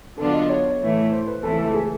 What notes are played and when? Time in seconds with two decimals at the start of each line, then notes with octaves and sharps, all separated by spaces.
0.17 D3 F#3 B3 D4 F4 A4
0.33 D#5
0.49 C#5
0.80 A2 E3 A3
1.12 C5
1.27 B4
1.43 C#2 C3 E3 A3 A4
1.58 A4
1.74 G#4